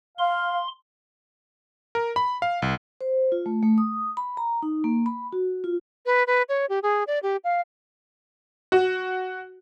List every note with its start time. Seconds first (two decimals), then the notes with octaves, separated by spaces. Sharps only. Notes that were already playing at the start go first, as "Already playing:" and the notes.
0.18 F5 C6
1.95 A#4
2.16 B5
2.42 F5
2.62 C2
3.01 C5
3.32 F4
3.46 A3
3.63 A3
3.78 D#6
4.17 B5
4.37 A#5
4.62 D#4
4.84 A#3
5.06 B5
5.33 F#4
5.64 F4
6.06 B4
6.27 B4
6.49 C#5
6.69 G4
6.83 G#4
7.07 D5
7.23 G4
7.44 F5
8.72 F#4